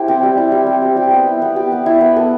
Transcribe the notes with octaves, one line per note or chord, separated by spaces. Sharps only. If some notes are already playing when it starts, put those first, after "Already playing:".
Already playing: E4 G4 C5
C4
G3
E4
G3
C4
G3
G4
B3
E4
B3
G4
B3
E4
B3
A4